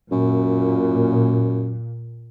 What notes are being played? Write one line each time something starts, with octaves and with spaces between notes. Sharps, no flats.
F#2 A#2